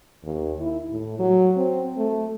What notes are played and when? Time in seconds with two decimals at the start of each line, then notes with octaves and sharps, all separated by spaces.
0.23 D#2
0.60 E4
0.90 A2
1.19 F#3
1.56 C4
1.97 A3